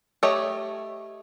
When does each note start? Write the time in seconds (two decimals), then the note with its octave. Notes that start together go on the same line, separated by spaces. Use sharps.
0.23 A3 G4 C#5 D#5